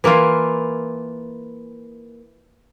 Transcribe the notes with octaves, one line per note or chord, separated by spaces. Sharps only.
E3 A#3 E4 F4